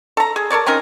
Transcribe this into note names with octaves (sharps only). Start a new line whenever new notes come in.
A4 A#5
G#4
A4 A#4 C#5 D5
C4 C#4 D#4 A#4